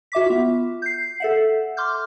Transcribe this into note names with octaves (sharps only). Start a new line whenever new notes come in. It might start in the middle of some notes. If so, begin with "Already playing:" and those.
F#4 E5 D6 B6
B3 F4
G6 C7
A4 E5 F#5
C6 D6 F6 G6